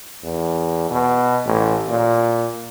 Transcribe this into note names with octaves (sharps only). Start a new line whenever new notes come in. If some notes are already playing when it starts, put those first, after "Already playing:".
E2
B2
A1
A#2